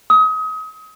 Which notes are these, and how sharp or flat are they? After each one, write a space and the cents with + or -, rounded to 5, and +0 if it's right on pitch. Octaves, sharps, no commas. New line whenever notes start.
D#6 +30